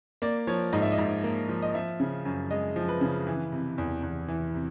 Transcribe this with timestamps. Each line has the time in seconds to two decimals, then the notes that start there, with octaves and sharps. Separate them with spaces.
0.22 A#3 D5
0.47 F3 C#5
0.73 G#2 D#5
0.82 E5
0.92 D#5
0.98 G#2
1.24 A#3
1.49 F3
1.62 D#5
1.74 F3 E5
2.00 C#3
2.25 F#2
2.51 G#3 D#5
2.76 F3
2.89 B4
3.01 C#3
3.27 E3
3.52 C3
3.78 E2
4.03 E2
4.28 E3
4.54 C3